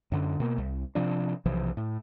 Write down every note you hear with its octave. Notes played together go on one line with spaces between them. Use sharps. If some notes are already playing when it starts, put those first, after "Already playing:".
F#2 D3
B2 A#3
C2
C3 F3 D4
B1 C3 E3 F3
A2